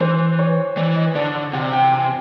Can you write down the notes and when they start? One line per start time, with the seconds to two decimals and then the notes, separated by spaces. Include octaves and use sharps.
0.01 E3 C5
0.39 C#5
0.77 E3 D5
0.96 D#5
1.15 D3 D5
1.35 D5
1.53 C3 F#5
1.73 G5
1.93 G#5